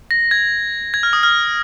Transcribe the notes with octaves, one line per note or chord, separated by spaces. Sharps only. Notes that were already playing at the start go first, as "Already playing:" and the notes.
A#6
G#6
G#6
F6
D#6
F6